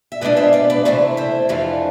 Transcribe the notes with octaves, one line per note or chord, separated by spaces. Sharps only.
E5
B2 G#3 D4 F4 B4 D5
C5 E5
B4 D5
B4 D5
C3 E3 A3 E4 C5 E5
C5 E5
F2 E3 A3 D4 F4